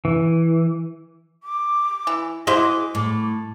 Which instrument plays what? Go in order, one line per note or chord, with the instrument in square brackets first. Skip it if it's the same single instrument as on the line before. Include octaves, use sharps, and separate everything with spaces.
[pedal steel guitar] E3
[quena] D6
[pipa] E3
[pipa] E4 C5 D#5 [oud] F#4 G#4 [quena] D6
[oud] A2